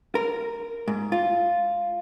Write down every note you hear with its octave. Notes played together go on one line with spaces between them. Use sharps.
A#4
G#2
F4